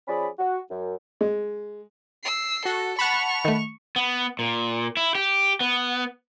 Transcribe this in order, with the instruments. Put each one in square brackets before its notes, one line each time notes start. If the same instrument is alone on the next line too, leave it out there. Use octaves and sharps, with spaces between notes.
[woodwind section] F3 C#4 G#4 D5 B5
F#4
F#2
[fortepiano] G#3
[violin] E6 C7
[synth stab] F#4 [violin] A4
[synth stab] F#5 A5 B5 [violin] C#6 F7
[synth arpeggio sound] D#3 A3
[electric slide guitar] B3
A#2
E4
G4
B3